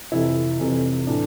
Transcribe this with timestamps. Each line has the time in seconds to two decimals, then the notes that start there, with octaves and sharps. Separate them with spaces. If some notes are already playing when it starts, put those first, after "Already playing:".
0.12 F1 F2 C3 E3 E4
0.59 F1 F2 C3 E3
1.07 A2 E3 D4